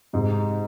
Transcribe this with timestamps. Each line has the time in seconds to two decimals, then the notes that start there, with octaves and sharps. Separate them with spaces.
0.13 G#2 C3